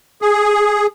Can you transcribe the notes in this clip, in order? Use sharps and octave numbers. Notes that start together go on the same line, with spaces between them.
G#4